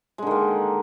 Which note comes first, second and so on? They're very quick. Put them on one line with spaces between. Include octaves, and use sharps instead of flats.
G#3 D3 D#3 A#3